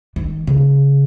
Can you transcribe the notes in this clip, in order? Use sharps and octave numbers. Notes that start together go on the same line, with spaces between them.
D#3
C#3